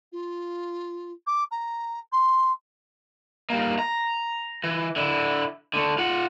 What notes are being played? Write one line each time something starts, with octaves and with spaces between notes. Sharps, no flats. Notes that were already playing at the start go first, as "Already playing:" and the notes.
F4
D6
A#5
C6
G3 A#3
A#5
E3
D3 E4
D3 A3
F4 F#5